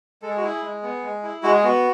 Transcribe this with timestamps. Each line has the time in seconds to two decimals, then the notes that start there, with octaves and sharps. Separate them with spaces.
0.22 G#3 A4
0.30 G#4
0.37 F#4
0.43 E4 G#4
0.62 G#3
0.83 B3
1.03 G#3
1.23 E4
1.43 G#3 F#4
1.54 G#4
1.63 B3 F#4